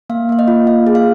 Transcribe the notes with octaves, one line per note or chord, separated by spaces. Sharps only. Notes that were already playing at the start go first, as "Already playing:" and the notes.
A#3 F5
A#3 F5
D#5
F4
A#3 F5
G#4
F5